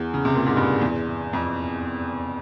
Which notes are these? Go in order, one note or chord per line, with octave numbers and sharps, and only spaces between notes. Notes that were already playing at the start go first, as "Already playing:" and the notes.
Already playing: E2
C#3
C3
A#2
G#2
G2
E2
F2